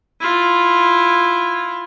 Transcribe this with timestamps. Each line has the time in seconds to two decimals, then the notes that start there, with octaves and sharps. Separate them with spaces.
0.20 E4 F4